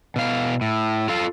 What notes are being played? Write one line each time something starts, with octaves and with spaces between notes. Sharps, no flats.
B2 F5
A2
F4 A4 F5